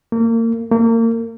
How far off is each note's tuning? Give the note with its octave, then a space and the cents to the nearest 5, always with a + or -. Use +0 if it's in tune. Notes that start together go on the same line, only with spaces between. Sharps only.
A#3 -35
A#3 -35